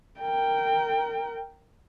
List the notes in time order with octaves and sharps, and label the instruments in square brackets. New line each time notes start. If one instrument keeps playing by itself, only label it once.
[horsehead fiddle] A#4 G5